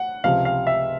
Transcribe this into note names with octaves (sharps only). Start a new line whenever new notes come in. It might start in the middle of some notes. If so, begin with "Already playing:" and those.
Already playing: F#5
C#2 C3 F3 F5
F5
E5